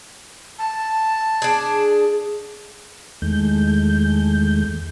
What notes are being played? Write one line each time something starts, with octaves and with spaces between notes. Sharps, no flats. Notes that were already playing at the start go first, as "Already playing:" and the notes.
A5
D4 G#4
E2 D#3 G#3 A3 G6